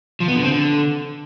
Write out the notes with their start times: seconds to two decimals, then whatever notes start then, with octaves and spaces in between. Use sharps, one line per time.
0.20 F3
0.28 B3
0.36 D3
0.43 C4
0.51 D3